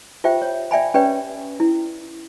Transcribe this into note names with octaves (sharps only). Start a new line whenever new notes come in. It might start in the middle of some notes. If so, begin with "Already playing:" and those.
F4 G4 C5 E5 G5
C#5
D5 E5 G5 G#5 B5
C#4 G4 B4 C#5 D5 G5
E4